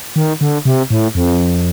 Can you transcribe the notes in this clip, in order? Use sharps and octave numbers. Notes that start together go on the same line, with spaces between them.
D#3
D3
C3
A2
F2